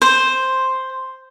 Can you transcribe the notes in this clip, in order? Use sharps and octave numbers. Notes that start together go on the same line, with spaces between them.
C5